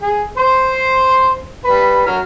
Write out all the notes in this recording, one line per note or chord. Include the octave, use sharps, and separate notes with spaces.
G#4
C5 C6
G3 B4
F#3 F6